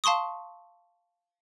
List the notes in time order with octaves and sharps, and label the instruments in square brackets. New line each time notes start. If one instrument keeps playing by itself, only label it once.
[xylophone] F5 A5 C6 C#6 D#6